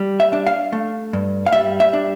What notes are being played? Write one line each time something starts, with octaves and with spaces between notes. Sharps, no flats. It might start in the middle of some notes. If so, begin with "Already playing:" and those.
Already playing: G3
E5
D4
F5
A3
G2
F5
G3 E5
E5
D4